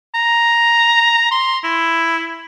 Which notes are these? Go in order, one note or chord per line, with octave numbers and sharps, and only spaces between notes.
A#5
C6
E4